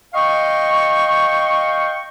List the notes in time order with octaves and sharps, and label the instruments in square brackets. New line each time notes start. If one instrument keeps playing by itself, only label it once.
[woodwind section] D#5 F5 G5 C#6